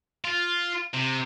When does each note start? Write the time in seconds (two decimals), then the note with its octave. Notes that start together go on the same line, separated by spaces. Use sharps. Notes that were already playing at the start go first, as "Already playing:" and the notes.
0.25 F4
0.94 C3